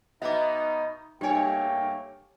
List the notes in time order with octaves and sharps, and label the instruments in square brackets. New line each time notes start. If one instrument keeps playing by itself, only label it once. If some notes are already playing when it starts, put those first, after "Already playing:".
[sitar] B2 B3 [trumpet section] D#4 [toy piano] E5 D6
[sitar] G2 C#5 [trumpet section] A3 A#3 G5 [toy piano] G4 G#5